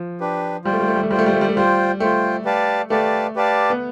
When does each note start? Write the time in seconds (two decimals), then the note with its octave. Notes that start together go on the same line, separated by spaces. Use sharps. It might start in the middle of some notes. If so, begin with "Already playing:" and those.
Already playing: F3
0.20 D4 G4 B4
0.65 G3 F4 C5 G5
0.73 A3
0.80 G3
0.88 A3
0.96 G3
1.03 A3
1.11 G3 F4 C5 G5
1.19 A3
1.26 G3
1.33 A3
1.41 G3
1.49 A3
1.56 G3 F4 C5 G5
2.00 A3 F4 C5 G5
2.45 G4 B4 D5 F5 A5
2.90 A3 G4 B4 D5 F5 A5
3.36 G4 B4 D5 F5 A5
3.70 B3